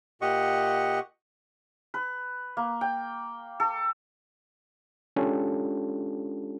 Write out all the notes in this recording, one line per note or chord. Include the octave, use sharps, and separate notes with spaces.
A#2 G4 D#5 F#5 C#6
B4
A#3
G5
A4
G#3 C#4 D4 F4 G4 A4